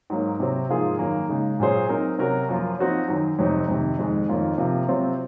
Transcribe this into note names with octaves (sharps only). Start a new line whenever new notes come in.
G#2 F#3 A#3
C3 F#3 C4
G#2 F3 A#3 F4 G#4
F#2 D#3 A#3
C#3 G#3 D#4
A#2 F#3 C#4 G#4 C5
F#3 C4 D#4 A#4
C3 F#3 C#4 F#4 A#4
F#2 F3 A#3 F4
F3 C4 D#4 F#4 C#5
F#2 D#3 F#3
F2 C3 F#3 C4 D#4
F2 C3 D#3
F2 D#3 G#3
F2 D#3 A#3 C#4 F4
C3 F3 A#3
C3 F#3 C4 F4